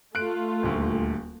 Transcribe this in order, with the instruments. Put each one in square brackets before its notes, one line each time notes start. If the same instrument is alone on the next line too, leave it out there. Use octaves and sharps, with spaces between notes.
[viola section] A3 F4 [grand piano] F#6 D7
[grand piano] D#1 D2